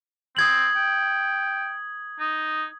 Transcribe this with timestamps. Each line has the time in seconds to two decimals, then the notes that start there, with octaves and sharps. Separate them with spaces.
0.37 C4 D#6 G#6 F#7
0.76 G5
2.19 D#4